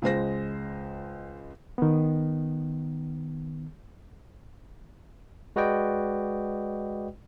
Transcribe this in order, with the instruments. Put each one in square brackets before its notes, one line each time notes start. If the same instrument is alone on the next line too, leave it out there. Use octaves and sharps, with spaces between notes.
[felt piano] C#2 G#3 C5 A#6
[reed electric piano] D#3 B3
[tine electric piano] G#3 F#4 B4 D5 D#5 G5